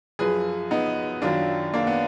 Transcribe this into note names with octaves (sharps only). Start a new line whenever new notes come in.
F#2 F3 G#4 B4
B3 D#4
F#2 D#3 F#3 D4 F4
A#3 D4
B3